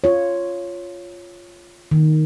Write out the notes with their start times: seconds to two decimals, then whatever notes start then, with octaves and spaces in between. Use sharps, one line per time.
0.04 F4 C#5
1.91 D#3